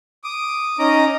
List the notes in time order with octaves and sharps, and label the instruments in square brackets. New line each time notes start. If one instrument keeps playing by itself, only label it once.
[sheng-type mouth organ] D6 D#6
C#4 D#4 D#5 A#5 D6 D#6